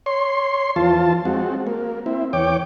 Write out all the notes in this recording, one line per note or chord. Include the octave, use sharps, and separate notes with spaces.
C#5 C6
E2 F3 F4 A5
G#3 C4 F#4
A#3
C4 E4
E2 C#5 G5 D6